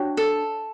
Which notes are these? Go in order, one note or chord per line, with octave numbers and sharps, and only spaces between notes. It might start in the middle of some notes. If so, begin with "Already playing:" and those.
Already playing: D4 F#4 C#5 G5
A4